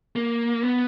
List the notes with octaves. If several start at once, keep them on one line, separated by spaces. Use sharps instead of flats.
A#3
B3